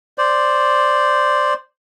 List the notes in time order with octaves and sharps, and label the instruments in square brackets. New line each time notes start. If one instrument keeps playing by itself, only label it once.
[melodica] C5 D5